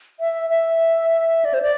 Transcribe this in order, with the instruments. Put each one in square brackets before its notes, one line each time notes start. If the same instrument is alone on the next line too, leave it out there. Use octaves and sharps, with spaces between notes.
[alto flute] E5
E5
D5
C5
D5